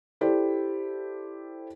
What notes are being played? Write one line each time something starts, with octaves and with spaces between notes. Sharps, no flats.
E4 G4 A4 C5 D5